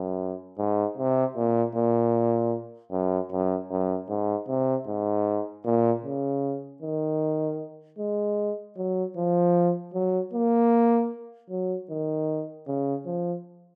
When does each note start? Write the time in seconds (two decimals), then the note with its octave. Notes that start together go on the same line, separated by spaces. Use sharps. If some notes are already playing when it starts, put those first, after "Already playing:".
Already playing: F#2
0.58 G#2
0.98 C3
1.36 A#2
1.75 A#2
2.92 F#2
3.31 F#2
3.70 F#2
4.09 G#2
4.49 C3
4.87 G#2
5.65 A#2
6.04 C#3
6.82 D#3
7.99 G#3
8.77 F#3
9.17 F3
9.94 F#3
10.33 A#3
11.50 F#3
11.90 D#3
12.67 C#3
13.06 F3